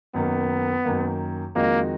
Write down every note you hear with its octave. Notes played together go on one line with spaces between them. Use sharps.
F#2 D#3 A#3 B3
F#2 D#3 A#3
F2 D#3 G#3 A#3 D#4 F#4